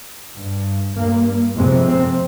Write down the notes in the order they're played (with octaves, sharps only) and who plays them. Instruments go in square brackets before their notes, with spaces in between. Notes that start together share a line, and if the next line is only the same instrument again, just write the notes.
[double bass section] G2
G2 A#3
F2 C3 G#3
C4